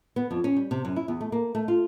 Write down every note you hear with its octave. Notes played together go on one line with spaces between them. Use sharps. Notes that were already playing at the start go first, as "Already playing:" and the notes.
B3
F2
C#4
G3
C3
F#2
E4
E2
A3
A#3
A3
F4